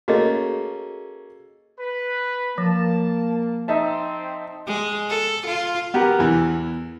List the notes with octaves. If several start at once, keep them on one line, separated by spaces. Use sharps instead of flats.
A3 A#3 C#4 F#4 G#4 D#5
B4
F3 A#3 A5
C4 D#4 E5 A5
G#3
A4
F4
B3 G4 A#4
E2 E3